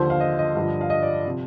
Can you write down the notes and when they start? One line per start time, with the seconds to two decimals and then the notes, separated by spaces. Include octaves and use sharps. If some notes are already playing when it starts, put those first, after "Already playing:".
Already playing: D#2 D3 F3 C5
0.10 F5
0.20 D#5
0.39 D#5
0.55 G2 D3 F3
0.81 F5
0.90 D#5
1.02 D5
1.25 C3 F3